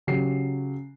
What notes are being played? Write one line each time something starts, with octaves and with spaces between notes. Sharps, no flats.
C#3 F#3 G4 C7